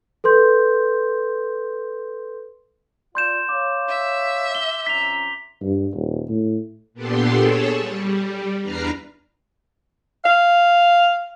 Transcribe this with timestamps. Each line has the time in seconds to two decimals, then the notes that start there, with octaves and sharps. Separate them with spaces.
0.24 A4 B4 C6 G6
3.15 F4 D5 C6 G6 E7
3.49 C#5 F5 D6
3.89 E5
4.55 G7
4.87 F2 C#4 A#5 B6 F7
5.62 G2
5.94 D#1
6.29 A2
6.94 A#2 B3 D4 G4 A4 C6
7.38 G#4 A4 C#5 A5
7.79 G3
8.62 E2 D4 B4 A#5 F6 C7
10.23 F5